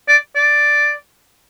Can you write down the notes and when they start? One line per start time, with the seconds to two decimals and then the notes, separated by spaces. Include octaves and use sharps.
0.08 D5
0.36 D5